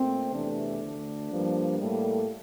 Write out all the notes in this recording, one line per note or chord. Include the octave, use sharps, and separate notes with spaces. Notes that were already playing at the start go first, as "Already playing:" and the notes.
Already playing: A#2 A3 C4
E2 C3 E3 A3 D4
D2 D3 A3
G2 F3 A#3
A2 G3 A#3 A4